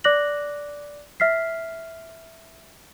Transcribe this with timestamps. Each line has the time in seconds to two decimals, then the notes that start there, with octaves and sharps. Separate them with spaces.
0.04 D5 D6 F#6 A#6 F#7
1.20 E5 F6 B6 C7